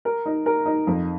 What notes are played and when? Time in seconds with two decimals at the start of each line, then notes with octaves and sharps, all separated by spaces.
0.05 A#4
0.26 D#4
0.46 A#4
0.66 D#4
0.87 F2